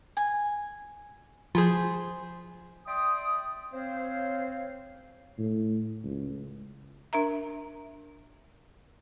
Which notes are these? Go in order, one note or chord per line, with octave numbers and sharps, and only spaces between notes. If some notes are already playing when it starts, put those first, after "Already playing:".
G#5
F3 F4 G#4 C5 G#5 B5
D5 E5 G5 C6 D#6
C4 C5 C#5 F5
A2
C#2
D4 A#4 E5 A#5